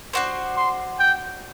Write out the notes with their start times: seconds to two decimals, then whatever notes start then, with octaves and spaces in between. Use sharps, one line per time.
0.13 D4 F#4 C5
0.57 C6
0.99 G5